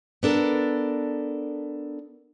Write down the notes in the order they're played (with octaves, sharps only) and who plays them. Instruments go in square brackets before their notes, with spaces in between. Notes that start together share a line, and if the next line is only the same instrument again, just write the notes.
[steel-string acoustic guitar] B3 D4 A4 A#4